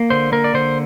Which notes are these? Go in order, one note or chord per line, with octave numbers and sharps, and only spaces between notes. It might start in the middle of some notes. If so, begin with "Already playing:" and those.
Already playing: A#3
D3 C5
A#3 A#4
D5
D3 C5